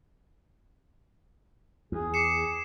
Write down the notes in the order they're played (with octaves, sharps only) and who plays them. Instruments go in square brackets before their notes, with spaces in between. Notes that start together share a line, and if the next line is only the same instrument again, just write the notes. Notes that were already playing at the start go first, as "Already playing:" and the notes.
[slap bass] E2 [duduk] G#4
[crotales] D6 C7 E7 [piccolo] C#7